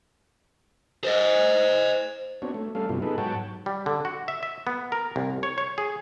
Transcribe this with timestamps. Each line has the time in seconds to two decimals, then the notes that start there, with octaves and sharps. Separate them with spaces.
1.04 C5 D#5
2.42 B3 C4 D4 F#4 C#5
2.54 A3
2.75 G3 A3 C#4 A4 F5
2.89 G2 C3 F#3 B3 E4 F4
3.02 B3 D#4 G#4 A4 B4
3.18 G#2 F#3 C#5 F#5 G5 A5
3.66 G3
3.86 D3
4.05 F#4
4.28 E5
4.43 E5
4.67 B3
4.92 A#4
5.16 C2
5.43 C#5
5.58 C#5
5.78 G#4